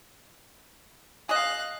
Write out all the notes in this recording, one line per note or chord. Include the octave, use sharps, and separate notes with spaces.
G#4 D#5 F5 F#6